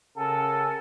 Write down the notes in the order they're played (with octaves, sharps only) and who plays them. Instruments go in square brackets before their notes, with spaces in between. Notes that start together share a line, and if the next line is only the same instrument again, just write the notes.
[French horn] C#3 [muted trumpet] A4 [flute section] A#4 F#5 G#5